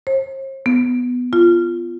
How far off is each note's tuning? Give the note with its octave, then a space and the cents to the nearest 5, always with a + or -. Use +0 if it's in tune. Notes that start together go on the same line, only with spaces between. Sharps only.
C5 +45
B3 +5
F4 -15